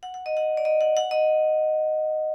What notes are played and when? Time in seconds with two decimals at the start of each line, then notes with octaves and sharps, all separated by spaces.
0.03 F#5
0.14 F#5
0.26 D#5
0.37 F#5
0.57 D5
0.65 D#5
0.81 F#5
0.97 F#5
1.11 D#5